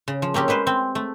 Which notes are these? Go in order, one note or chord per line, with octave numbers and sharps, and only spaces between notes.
C#3
F3
A#3 C4 C#4 G4
G#3 C#4 B4 C5
C4
A3